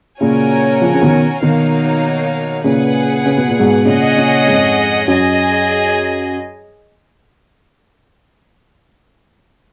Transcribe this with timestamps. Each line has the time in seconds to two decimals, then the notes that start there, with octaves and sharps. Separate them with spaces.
0.21 A#2 C#3 C#4 F#4 A#4 C#5 G#5
0.81 C#3 F3
0.94 C#3
1.02 B2 D#3
1.42 B2 D#3 A#3 D#4 F#4 C#5 F5
2.64 A#2 C#3 G#4 B4 F#5
3.26 C#3
3.37 B2
3.48 A#2
3.59 G#2 B2
3.85 A#2 C#3 C#4 G#4 D#5 F#5
4.16 A#2 C#3
4.46 F2 G#2
5.08 F#2 G#4 D#5 G#5